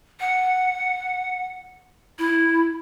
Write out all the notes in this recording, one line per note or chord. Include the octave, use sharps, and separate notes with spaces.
F#5
E4